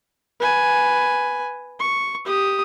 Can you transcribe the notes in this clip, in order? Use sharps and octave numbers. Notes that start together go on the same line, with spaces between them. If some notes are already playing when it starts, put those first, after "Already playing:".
B4 G#5
C#6
G4 D#6